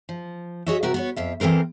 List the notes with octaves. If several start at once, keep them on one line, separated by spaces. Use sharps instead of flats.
F3
F#4 G#4 C#5 D#5 E5
C3 F#4 G4 A#4
B3 F#4 C#5
F2 F4 E5
E3 C4 A4 A#4 C5